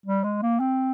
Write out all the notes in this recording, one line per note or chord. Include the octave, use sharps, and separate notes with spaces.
G3
G#3
A#3
C4